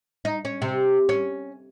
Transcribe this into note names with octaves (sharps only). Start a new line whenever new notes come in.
D#4
C#4
C3
C#4